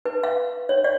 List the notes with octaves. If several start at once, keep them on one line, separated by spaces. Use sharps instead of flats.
B4
F5
C#5
D5